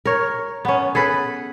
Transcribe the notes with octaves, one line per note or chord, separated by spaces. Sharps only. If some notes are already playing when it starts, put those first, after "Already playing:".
A#4 C#5
B3 C#4
G#4 A4 B4